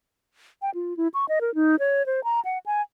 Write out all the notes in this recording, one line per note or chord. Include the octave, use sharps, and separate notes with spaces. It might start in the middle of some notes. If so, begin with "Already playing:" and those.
G5
F4
E4
C#6
D#5
A#4
D#4
C#5
C5
A#5
F#5
G#5